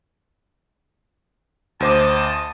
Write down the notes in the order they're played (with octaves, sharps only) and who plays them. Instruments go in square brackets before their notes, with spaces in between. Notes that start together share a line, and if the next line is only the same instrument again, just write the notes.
[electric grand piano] D2 C5 D6 [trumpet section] D#5 A5